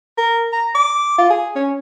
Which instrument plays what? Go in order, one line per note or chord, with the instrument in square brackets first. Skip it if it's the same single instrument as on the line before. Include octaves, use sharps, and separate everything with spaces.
[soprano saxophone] A#4
A#5
D6
F4
G#4
C#4